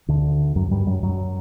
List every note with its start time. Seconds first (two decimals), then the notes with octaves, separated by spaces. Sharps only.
0.08 D2 D3
0.56 F#2 F#3
0.71 G2 G3
0.87 F#2 F#3
1.03 F#2 F#3